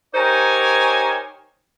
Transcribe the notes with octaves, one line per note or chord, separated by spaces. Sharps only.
D#4 G4 A#4 C5 C#5 G#5